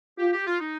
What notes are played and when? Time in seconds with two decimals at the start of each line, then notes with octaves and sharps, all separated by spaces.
0.18 F4 G4
0.33 G4
0.47 F4
0.60 D#4